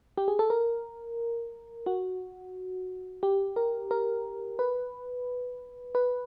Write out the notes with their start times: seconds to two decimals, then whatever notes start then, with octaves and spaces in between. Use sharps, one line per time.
0.17 G4
0.28 G#4
0.39 A4
0.50 A#4
1.86 F#4
3.23 G4
3.56 A#4
3.91 A#4
4.59 B4
5.95 B4